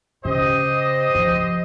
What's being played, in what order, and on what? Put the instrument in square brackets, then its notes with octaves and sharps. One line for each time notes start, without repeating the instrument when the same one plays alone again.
[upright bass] C#3 [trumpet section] G4 C5 D#5
[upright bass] F3